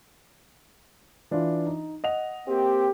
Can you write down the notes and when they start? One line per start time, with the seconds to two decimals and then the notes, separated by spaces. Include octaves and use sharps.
1.31 E3 D4 F4
1.67 D#4
2.04 D#5 F#5 F7
2.48 A#3 C4 G4